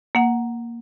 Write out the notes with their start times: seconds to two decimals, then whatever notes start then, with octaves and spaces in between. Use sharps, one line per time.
0.15 A#3 F#5